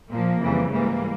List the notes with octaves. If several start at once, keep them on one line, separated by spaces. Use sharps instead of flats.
A#2 F3 A#3
F2 C#3 E3 G3
G#2 E3 G3 A#3